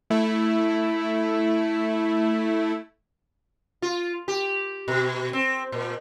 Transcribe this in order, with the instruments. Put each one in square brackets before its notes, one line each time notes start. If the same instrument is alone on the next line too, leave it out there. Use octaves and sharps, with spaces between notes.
[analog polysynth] A3 E4
[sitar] F4
G4
B2
C4
A#2